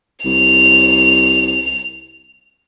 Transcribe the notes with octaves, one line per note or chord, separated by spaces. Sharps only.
C2 F7